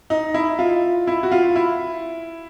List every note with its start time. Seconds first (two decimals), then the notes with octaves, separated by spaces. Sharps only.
0.10 D#4
0.34 E4
0.59 F4
1.07 E4
1.23 F#4
1.32 F4
1.56 E4